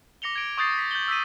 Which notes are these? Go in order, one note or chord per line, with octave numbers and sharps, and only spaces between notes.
D6 A#6 C#7 F7 G7
G#6 D7 F7
C#6 D#6 G6 A6 C7
A6 B6
G6 A6 F#7 G7
E6 G6 B6 D#7